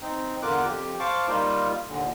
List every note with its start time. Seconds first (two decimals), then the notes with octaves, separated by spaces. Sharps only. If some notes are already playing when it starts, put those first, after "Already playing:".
0.01 C4 D#4
0.42 E2 D3 F4 A#4 D6 F#6
0.66 F2 G4
1.00 C5 F5 A5 C#6 D6
1.28 G3 A#3 D#4 F4
1.88 D#2 A#2 D3